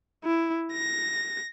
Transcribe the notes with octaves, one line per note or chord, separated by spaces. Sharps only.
E4
A#6